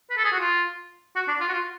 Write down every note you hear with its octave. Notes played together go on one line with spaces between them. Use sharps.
B4
A4
G#4
F#4
F4
F#4
D4
F4
F#4
F4